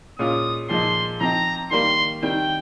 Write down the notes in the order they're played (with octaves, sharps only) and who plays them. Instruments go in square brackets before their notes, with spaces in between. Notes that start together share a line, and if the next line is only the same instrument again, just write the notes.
[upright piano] A#2 G#3 C#4 F4 [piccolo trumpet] D#6
[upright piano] A#2 F3 G#3 D#4 [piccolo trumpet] C6
[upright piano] F3 C4 D#4 [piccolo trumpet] A#5
[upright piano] D#3 G3 A#3 [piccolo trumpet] C6
[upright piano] D#3 G3 C4 [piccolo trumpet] G5